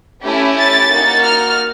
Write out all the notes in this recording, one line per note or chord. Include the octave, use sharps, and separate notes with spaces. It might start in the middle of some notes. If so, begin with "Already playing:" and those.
A3 C#4 E4 G4
A6
A#3 D#4 F#4
F6